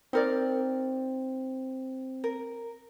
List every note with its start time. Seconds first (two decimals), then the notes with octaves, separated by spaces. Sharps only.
0.13 C4 D#4 A#4 D5
2.24 A#4